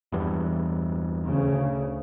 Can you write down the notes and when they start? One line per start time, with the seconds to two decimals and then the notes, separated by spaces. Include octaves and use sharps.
0.12 E2 G2 E3
1.25 D2 C#3